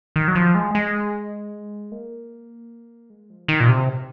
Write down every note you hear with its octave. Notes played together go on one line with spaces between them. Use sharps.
D#3
F#3
F3
G#3
G#3
A#3
G#3
F3
D#3
A#2
C3